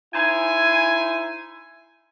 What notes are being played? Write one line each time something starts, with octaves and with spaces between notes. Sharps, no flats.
D#4 E4 C5 G#5